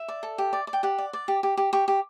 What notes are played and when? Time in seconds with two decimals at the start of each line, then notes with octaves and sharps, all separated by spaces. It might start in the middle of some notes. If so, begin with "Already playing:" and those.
Already playing: E5
0.08 D5
0.23 A4
0.38 G4
0.53 D5
0.67 D5
0.73 G5
0.83 G4 F#5
0.98 D5
1.13 D5
1.28 G4
1.43 G4
1.57 G4
1.73 G4 C#6
1.88 G4